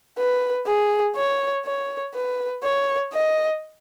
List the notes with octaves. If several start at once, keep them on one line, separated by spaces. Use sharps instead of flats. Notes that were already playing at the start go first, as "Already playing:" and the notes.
B4
G#4
C#5
C#5
B4
C#5
D#5